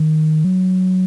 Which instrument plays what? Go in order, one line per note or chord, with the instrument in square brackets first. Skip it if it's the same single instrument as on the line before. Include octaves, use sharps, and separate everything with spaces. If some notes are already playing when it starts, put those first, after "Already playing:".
Already playing: [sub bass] D#3
F#3